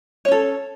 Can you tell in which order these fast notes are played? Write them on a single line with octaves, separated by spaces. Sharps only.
C#5 C#4 A4